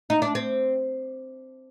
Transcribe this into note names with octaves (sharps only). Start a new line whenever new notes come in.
D#4
D4
C4